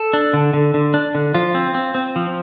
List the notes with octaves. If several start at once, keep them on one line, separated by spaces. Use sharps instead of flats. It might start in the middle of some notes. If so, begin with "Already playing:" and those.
Already playing: A4
D4
D3
D3
D3
D4
D3
F3 F4
C4
C4
C4
F3